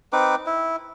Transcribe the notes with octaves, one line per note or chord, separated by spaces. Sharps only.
C4 D#4 B4 D6
E4